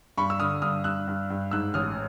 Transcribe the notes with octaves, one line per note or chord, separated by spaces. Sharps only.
G2 B5 C#6
E6
D3 D#6 F6
G2 D#6 F6
G2 E6 F#6
G2
G2
G#2 E6 F#6
A1 D#6 F6